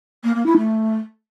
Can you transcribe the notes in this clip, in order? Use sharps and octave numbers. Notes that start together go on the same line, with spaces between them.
A#3
A#3
E4
A3